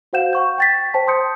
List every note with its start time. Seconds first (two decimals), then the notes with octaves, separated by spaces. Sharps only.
0.13 F#4 C5 F5 F#5 G6 E7
0.33 F#5 C#6 G6
0.58 G5 A6 B6
0.94 C5 G5 A5
1.07 C6 D#6 G6 C#7